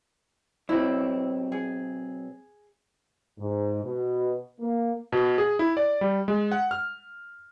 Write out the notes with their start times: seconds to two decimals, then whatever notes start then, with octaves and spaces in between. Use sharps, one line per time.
0.69 B1 C4 E4
1.52 G#4
3.39 G#2
3.83 B2
4.60 A#3
5.12 B2
5.38 G#4
5.59 E4
5.77 D5
6.01 G3
6.28 G#3
6.52 F#5
6.71 F6